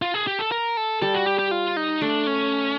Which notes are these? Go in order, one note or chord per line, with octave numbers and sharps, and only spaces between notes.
F4
G#4
G4
A4
A#4
A4
G3 A4
F#4
G4
G4
F4
D#4
A3 D4
C#4